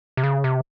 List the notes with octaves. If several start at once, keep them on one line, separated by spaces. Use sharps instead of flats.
C3
C#3
C3